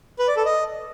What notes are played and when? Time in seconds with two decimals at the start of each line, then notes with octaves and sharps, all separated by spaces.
0.19 B4
0.28 D5
0.37 A4
0.45 D#5